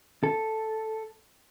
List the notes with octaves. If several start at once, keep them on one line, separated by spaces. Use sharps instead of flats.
A4